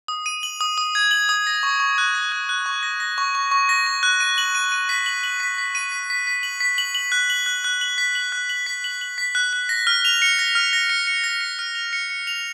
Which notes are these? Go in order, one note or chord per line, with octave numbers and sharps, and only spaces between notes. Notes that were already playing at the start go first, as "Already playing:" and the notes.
D#6
D#7
F#7
D#6
D#6
G#6
F#7
D#6
A#6
C#6
C#6
F#6
A#6
F#6
F#6
C#6
A#6
A#6
C#6
C#6
C#6
A#6
C#6
F#6
D#7
F#7
D#7
D#7
B6
F#7
F#7
B6
B6
D#7
B6
B6
B6
F#7
B6
F#7
F#7
F#6
F#7
F#6
F#6
F#7
B6
F#7
F#6
F#7
B6
F#7
F#7
B6
F#6
F#6
A#6
F6
F7
C#7
A#6
F6
A#6
C#7
C#7
A#6
C#7
F6
F7
C#7
C#7
F7